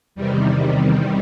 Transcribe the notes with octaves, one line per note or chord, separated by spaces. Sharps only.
E2 C3 D#3 G3